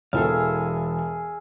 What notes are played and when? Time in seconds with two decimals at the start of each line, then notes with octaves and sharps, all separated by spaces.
0.13 E1 E3 G#4 A4 E5 F5